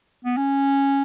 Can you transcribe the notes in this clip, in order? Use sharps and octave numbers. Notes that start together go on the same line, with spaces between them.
B3
C#4